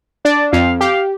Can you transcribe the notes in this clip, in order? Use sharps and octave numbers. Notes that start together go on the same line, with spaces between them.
D4 D5
F2 F5
G4 F5